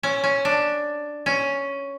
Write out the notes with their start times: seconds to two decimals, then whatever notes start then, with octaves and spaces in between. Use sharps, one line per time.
0.03 C#4
0.24 C#4
0.45 D4
1.26 C#4